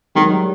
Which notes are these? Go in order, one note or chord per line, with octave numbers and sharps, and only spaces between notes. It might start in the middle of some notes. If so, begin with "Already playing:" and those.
D#3 F#3 G#3
G3